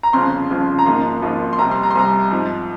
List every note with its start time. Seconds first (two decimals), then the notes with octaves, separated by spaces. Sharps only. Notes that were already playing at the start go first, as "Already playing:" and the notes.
0.03 A#5
0.13 G1 F2 C#3 F3 C4 C6
0.50 G1 F2 C#3 F3 C4
0.79 A#5
0.86 G#1 G#2 F3 A#3 C6
1.22 G#1 G#2 F3 A#3
1.53 C6
1.59 C2 C3 G3 A#5
1.71 C6
1.83 A#5
1.91 C6
1.95 C2 C3 G3 A#5
2.32 G#2 F3 C4